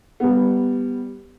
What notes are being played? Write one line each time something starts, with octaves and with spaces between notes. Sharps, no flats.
G3 B3